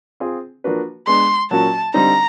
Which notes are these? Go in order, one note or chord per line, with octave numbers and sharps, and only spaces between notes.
C4 F4 G#4
F3 A#3 D4 F#4 B4
G#3 B3 D4 C6
A#2 F#3 A#3 C#4 F#4 A5
D3 G3 C4 D#4 A#5